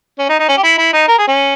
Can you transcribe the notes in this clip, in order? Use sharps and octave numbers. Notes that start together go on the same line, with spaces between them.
C#4
D#4
D#4
C#4
G4
E4
E4
D#4
A#4
G#4
C#4